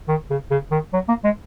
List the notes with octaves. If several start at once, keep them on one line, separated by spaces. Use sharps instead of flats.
D#3
C#3
C#3
D#3
F#3
A#3
G#3